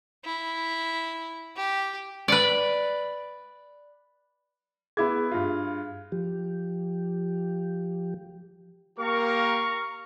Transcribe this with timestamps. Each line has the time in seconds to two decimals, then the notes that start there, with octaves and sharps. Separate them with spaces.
0.25 E4
1.56 G4
2.28 B4 D5
4.97 B3 E4 G#4 G#6
5.31 G2 F4
6.12 F3 G4
8.99 A#3 G4 A#4 F5 A#5 C#6